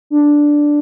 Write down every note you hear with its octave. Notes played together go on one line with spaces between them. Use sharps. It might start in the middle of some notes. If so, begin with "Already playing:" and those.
D4